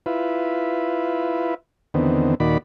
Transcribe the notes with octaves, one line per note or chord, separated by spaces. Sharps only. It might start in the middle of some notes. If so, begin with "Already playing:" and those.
E4 F4 B4
E2 D3 D#3 B3 C4
D#2 A#2 D#3 F#4 D5 B5